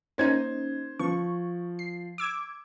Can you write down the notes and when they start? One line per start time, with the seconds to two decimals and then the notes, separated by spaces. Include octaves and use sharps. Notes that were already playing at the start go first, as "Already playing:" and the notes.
0.18 A#3 C#4 D#4 C5 G#6
0.99 F3 C#6
1.79 C7
2.18 D6 E6 G#6